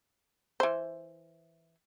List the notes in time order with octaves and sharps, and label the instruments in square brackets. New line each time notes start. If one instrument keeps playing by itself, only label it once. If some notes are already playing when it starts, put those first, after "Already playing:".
[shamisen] E3 C5